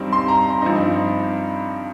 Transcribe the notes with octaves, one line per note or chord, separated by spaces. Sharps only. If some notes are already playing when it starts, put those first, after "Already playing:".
Already playing: G2 G3 C4 D#4
C6
A#5
A#5
G2 F3 C4 D#4